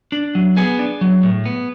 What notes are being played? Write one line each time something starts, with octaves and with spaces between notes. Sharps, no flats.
D4
F#3
B3 G#4 G#5
D4
F#3
A2
B3